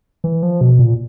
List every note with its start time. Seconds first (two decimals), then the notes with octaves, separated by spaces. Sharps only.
0.24 E3
0.43 F3
0.61 B2
0.79 A#2